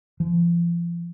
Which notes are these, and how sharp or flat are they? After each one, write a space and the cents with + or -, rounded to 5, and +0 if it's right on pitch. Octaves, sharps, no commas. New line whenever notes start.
F3 -35